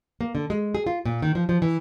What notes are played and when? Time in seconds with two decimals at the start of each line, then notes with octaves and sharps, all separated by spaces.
0.21 A#3
0.35 D3
0.50 G#3
0.75 G#4
0.87 F4
1.05 A#2
1.22 D#3
1.35 F3
1.49 F3
1.62 E3